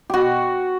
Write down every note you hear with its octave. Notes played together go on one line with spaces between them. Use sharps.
B2 F#4 G4